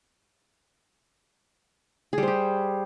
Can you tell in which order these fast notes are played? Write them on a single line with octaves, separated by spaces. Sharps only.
G#4 G3 C5 G4